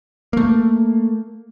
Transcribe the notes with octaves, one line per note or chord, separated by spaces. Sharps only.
A3 A#3